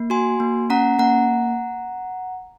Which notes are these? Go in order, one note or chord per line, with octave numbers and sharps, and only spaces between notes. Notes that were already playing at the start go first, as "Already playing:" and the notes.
Already playing: A#3
F#4 G#5 C6
A#3
C#4 F#5 A#5
A#3 F#5 A#5